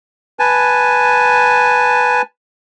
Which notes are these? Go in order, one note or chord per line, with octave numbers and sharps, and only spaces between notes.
B4 G#5 A5